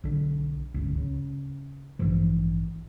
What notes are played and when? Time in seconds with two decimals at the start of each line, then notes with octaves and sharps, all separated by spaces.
0.04 B1 D3
0.74 D1 G1 C#2
0.97 C#3
1.99 A1 G2 E3 F3